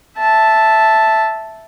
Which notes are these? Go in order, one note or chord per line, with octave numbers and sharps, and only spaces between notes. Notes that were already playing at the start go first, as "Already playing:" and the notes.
E5 A5